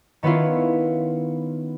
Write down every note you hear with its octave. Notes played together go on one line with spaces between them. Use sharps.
D#3 B3 C#4 E4 F4